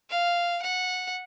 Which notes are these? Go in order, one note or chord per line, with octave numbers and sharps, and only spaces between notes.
F5
F#5